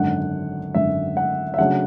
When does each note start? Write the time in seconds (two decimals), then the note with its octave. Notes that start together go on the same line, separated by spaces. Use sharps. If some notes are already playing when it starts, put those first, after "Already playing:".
Already playing: G#1 F#2 D3 F#5
0.75 G#1 F#2 D3 E5
1.17 F#5
1.54 E5
1.58 C#3 F#3 A3 D4 F#5